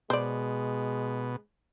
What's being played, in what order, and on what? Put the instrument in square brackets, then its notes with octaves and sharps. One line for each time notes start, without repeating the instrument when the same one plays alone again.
[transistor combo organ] B2 [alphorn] G#3 [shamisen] C5 D5